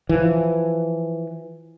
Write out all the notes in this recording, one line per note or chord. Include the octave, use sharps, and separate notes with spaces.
E3 F3